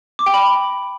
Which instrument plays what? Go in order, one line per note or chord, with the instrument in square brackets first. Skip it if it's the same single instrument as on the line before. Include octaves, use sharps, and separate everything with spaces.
[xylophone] D6
G5
B5